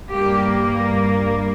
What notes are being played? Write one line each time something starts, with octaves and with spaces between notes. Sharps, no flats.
G2 G3 A#3 G4